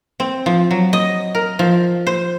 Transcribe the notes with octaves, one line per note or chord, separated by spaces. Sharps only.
C4
F3
F#3
D#5
A#4
F3
C5